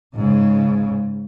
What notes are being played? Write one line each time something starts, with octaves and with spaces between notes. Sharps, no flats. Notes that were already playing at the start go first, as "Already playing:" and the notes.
G#2 C#3